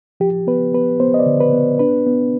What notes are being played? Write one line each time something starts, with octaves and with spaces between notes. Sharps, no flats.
F3 G4
B3 B4
B3 B4
B3 C5
D#5
D5
D3
B4
B3
D4 B4
B3